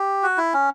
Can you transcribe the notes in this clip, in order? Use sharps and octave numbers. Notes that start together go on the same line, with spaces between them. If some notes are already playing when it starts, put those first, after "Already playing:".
Already playing: G4
F#4
E4
C#4